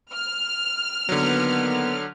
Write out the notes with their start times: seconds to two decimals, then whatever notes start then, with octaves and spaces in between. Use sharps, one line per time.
0.14 F6
1.09 D3 D#3 F#3 A#3 B3